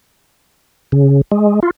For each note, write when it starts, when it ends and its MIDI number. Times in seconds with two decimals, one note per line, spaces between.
0.92 1.21 49
1.32 1.60 56
1.63 1.71 65